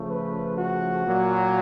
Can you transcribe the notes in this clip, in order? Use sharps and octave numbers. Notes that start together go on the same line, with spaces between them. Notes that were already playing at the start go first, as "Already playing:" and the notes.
Already playing: C#3 F3 A3
B4
F#4
A#2 F#3 A#3